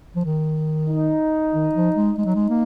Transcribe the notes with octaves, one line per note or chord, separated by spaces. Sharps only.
F3
D#3
D#4
D#3
F3
G#3
G#3 D#4
F#3
G#3
A#3